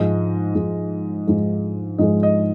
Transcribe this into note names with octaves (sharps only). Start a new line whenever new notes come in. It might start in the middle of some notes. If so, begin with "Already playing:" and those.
Already playing: G#2 F3 G#3 D#5
G#2 F3 G#3
G#2 F3 G#3
G#2 F3 G#3 D#5
D#5